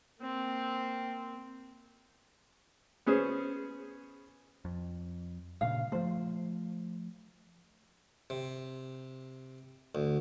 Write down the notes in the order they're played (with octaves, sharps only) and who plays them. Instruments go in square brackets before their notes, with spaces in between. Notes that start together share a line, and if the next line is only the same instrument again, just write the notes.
[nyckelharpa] A#3 C4
[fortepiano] B3 C#4 G#4 C5
[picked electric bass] F2
[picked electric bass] G2 A#2 C#3 [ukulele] F5
[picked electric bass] F3 A3 [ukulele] C5
[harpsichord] C3
D2